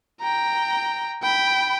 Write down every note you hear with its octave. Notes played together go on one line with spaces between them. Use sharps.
G5 A#5
G5 B5